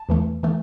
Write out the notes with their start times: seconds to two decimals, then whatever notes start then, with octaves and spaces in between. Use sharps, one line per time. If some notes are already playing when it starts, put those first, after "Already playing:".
Already playing: A5
0.09 E2 E3 A3
0.43 E3 A3